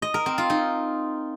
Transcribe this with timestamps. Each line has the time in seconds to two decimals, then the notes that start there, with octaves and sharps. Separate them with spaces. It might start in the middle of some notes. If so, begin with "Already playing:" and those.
0.02 D#5
0.14 A#4
0.26 C4
0.38 F4
0.50 D#4